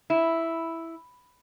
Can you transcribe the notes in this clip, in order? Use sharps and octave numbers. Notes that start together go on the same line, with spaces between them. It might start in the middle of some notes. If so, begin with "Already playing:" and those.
E4